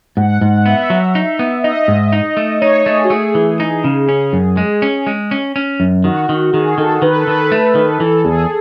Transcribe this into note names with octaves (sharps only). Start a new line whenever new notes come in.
G#2 F#5
G#2
F#5
B3 E5
F#3
D#4
B3
D#4 D#5
G#2
D#4
A3
D#4 C#5
A3 G#4
F#4
A3 G#4
E3
D#4
C#3
C#4 G#4
F#2
G#3
C#4
G#3
C#4
C#4
F#2
D#3 F#4
D#3
D#3 G#4
D#3 A4
D#3 B4
A4
D#3 B4
A3
D#3
E3 A4
E2 G#4